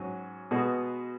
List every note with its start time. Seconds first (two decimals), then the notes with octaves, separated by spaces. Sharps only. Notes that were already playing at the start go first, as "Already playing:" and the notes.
Already playing: G#2 F#3 C#4 F#4
0.51 B2 G#3 B3 F#4